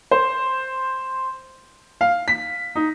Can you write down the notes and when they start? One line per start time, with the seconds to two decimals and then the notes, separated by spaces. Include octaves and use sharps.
0.11 C5
2.01 F5
2.28 B6
2.75 D#4